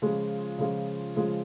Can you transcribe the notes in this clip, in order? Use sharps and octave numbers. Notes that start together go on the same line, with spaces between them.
C#3 F3 G#3 F4
C#3 F3 G#3 F4
C#3 F3 G#3 F4